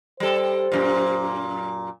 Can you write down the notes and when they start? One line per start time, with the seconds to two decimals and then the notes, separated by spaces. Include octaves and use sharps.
0.20 G3 A4 C5
0.72 F#2 A#2